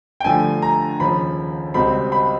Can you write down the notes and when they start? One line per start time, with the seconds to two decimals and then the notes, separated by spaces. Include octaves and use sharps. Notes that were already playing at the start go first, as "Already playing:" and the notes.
0.20 G5
0.24 G2 D3 F3 A3 G#5
0.62 A#5
1.00 D#2 C#3 F3 B5
1.74 C#2 B2 G3 C4 B5
2.12 B5